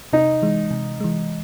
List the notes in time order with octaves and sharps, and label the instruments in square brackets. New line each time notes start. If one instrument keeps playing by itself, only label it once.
[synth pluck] C3 [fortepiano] D#4
[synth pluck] E3 G#3
C3
E3 G#3